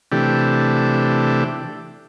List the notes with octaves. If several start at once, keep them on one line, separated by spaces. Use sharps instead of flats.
C3 E3 A3 D4 G4